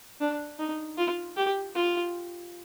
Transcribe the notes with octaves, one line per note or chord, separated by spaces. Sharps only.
D4
D#4
F4
G4
F4